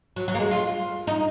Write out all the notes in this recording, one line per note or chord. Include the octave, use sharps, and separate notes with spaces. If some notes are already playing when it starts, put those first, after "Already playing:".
F#3
F#3
A#3
G#3
F4
D#4